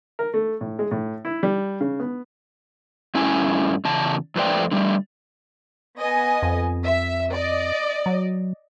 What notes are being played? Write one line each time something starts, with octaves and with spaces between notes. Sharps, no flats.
A#4
A3
A2
G#3
A2
E4
G3
C#3
B3
G2 A3 C#4 E4 G#5
E2 C#3 A5
F2 A3 B4 C5 D5 G5
D3 G3 A3
B3 D#5 G#5
F2
E5
D5 D#5
F#3